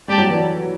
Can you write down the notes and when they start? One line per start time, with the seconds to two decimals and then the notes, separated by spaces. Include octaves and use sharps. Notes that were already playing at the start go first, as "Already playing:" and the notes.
0.08 G3 G4 D5 A5
0.18 F#3
0.29 E3